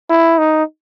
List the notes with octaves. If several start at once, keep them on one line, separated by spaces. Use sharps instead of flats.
E4
D#4